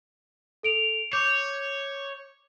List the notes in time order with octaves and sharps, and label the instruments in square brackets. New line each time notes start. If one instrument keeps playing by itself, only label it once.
[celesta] A4 D7 F7
[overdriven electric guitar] C#5 [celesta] D6 G6